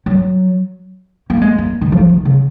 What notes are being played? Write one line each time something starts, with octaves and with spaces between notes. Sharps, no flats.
F#3
A#3
G#3
A#3
D#3
F3
D#3
C#3